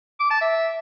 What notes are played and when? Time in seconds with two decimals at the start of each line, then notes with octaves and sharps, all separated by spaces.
0.20 D6
0.31 A5
0.41 E5